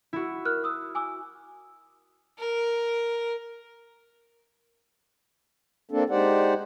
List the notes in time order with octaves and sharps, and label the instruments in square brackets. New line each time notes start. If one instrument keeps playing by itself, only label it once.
[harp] E4 F#4
[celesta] A#4 F6 F#6
D#6 E6
G#5 D6 E6
[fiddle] A#4
[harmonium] A#3 C4 D4 A4
G#3 D#4 G4 C5 D5 F#5